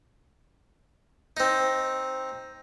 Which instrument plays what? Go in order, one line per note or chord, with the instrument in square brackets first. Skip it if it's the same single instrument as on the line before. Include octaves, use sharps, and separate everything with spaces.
[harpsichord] C4 D#4